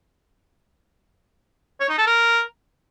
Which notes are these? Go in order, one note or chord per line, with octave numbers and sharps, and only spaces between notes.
C#5
D#4
A4
A#4